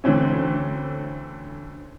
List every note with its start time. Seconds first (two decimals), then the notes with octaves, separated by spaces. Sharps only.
0.04 D2 D3 E3 C4 C#4